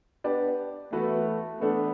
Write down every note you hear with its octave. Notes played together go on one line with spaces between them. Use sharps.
B3 D4 G4 B4 D5
E3 A3 B3 F#4 B4
E3 A3 B3 D4